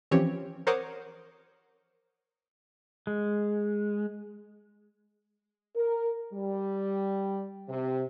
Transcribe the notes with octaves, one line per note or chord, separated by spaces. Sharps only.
E3 F3 C4 C#4 G4 C#5
A#4 C5 C#5 F#5 D6 D#6
G#3
A#4
G3
C3